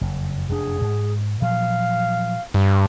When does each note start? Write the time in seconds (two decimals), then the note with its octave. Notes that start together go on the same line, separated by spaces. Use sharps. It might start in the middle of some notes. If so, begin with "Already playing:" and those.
0.01 F#1 F2
0.49 F1 F#2 D4 G#4
0.81 G#2
1.42 A#2 F3 F#3 F5
2.54 G2